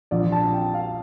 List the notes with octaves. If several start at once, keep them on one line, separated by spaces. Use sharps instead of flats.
A#1 A#2 F3 D5
A5
G5
F5